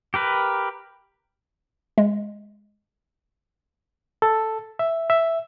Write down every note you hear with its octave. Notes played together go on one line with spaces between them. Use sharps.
G4 A#4 B4
G#3
A4
E5
E5